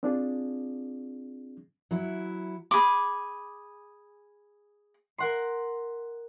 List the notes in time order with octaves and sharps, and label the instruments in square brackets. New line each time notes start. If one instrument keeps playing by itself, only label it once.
[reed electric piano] C4 D4 F4 G#4
[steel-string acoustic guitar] F#3 E4
[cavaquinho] G#4 B5 D6
[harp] A#4 F#5 C6